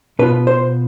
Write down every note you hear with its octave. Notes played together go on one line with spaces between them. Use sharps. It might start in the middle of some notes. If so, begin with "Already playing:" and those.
B2 B3 F4 B4
C5